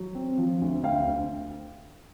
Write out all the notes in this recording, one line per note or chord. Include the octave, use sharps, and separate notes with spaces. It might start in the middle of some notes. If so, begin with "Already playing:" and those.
Already playing: F#3
C4
F3
D2
D2 F5 G5
D2